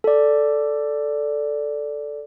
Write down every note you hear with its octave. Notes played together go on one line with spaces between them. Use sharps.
A4 D5